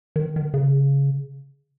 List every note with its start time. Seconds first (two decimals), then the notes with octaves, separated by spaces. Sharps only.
0.16 D#3
0.36 D#3
0.54 C#3